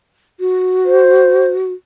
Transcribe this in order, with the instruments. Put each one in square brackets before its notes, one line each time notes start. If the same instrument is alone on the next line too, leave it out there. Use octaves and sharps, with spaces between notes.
[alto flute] F#4
[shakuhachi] C5